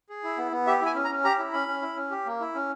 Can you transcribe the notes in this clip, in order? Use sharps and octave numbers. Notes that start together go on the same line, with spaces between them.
G#4
E4
B3
B3
G4 E5
E4 G#5
C#4
A#5
C#4
G4 A#5
E4
C#4 B5
C#4
E4
C#4
G4
A#3
E4
C#4